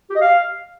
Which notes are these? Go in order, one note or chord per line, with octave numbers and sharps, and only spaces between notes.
G4
D#5
F5